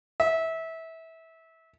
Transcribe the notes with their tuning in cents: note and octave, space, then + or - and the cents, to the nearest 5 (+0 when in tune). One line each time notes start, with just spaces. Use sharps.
E5 -20